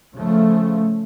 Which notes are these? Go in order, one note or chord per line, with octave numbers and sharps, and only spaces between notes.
C#3 F3 A3